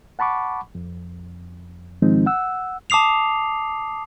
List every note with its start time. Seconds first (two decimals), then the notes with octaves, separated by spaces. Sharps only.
0.19 F#5 A5 B5 C#6 D6
0.75 F2
2.02 G#2 D#3 F3 G#3 C4 D#4
2.26 F#5 E6
2.90 A5 D6 D#6 C7 F7